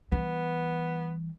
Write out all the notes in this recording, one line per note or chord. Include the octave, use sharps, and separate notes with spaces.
E3 G3 B3